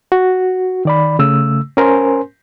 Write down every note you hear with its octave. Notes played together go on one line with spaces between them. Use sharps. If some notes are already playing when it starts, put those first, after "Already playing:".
F#4
D#3 D5 B5
C#3 A3 E6
C#4 A#4 C5 G#5 C6